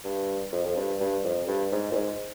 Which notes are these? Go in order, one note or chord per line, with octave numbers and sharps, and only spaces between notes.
G2
F2
F2
G2
G2
F2
G2
G#2
A#2
G#2